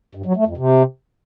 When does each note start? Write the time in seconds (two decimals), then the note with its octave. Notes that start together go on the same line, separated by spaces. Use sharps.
0.15 G2
0.26 F#3
0.36 A3
0.47 F2
0.57 C3